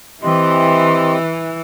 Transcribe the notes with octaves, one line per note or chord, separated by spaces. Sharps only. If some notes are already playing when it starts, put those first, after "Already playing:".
E3 C4 G4 D#5 C6